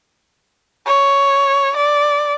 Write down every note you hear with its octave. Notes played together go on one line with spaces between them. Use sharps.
C#5
D5